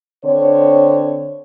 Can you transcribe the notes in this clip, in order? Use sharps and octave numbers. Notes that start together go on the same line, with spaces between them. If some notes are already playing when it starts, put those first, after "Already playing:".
D3 C4 C#5